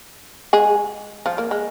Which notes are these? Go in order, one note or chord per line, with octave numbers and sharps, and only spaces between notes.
G#3 G#4
F3 F4
A#3
G#3